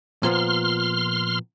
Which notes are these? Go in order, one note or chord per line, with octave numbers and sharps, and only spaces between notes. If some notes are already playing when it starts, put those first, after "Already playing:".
A#2 F3 B3 C6 F6